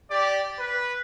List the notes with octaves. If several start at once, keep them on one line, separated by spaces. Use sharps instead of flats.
G4 D5
B4